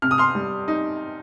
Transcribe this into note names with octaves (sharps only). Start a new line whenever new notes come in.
C3 F6
D#6
C6 F6
G3
D#4